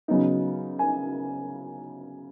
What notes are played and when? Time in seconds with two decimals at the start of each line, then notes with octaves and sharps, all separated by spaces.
0.08 C#3 F#3 B3 D#4
0.79 G#5